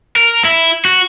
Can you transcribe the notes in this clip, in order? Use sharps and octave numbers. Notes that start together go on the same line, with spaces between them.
A#4
E4
F#4